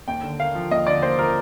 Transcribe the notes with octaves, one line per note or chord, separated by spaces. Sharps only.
D#2 G5
D3
A#3 F5
F3
D#2 D#5
D3 D5
A#3 C5
F3 A#4